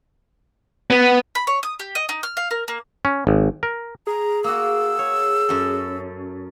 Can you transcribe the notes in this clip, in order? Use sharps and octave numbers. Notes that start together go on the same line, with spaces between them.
B3
B5
C#5
D#6
G4
D#5
D#4
F6
F5
A#4
A#3
C#4
G#1
A#4
G#4 A#5
A#3 F#4 E6
C#5
F#2 A4